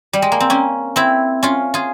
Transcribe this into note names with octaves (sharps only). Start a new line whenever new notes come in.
G3
G#3
A#3
C4
A#3 C#4
C4 E4
C#4 F4
F4 G#4